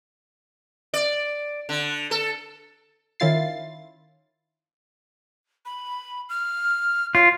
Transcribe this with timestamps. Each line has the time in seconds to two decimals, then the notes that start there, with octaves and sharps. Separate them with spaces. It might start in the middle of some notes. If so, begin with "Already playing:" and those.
0.94 D5
1.69 D3
2.11 A4
3.20 D#3 C#4 E4 F4 A6 C7
5.66 B5
6.29 F6
7.15 F4 C#5